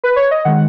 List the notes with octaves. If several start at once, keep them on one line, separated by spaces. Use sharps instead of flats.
B4
C#5
D#5
D#3 G#3 F#5